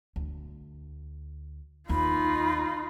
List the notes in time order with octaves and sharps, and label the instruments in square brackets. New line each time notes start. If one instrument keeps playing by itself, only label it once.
[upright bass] D2
[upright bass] D#2 [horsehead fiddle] D#4 F4 [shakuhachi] B5